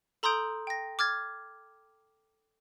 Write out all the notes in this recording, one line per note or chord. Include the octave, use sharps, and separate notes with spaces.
A4 A#5 C6 D#6 G6 D7
G5 A#6
D6 F6 G#6 A6